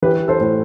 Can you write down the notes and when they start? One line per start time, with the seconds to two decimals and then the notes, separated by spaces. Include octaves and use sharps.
0.02 E3 G4 B4
0.28 A4 C5
0.41 A2